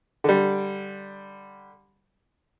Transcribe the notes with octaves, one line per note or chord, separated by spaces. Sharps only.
D3 G3